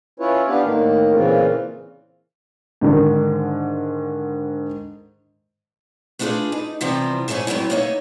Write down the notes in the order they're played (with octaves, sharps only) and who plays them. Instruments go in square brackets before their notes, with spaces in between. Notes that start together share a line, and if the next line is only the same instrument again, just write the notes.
[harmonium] C#4 E4 F4 B4 C#5
B3 D4 G4 B4 F5
A2 D#3 A#3
A#2 C#3 E3 C4 F4
[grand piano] G#2 D3 D#3
[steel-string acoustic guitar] A3 B3 D4 F4 G#4 B4
D#4
C3 E3 F3 G3 B3 C4
G#2 A3 G#4 C#5 E5 G#5
F#3 A3 B3 C4 E4
A#3 B3 D#4 C#5 E5